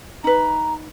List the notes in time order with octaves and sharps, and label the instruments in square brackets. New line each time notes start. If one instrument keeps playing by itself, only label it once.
[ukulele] D#4 B4 [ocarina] A#5